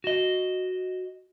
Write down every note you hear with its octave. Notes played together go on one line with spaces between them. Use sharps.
F#4 D#5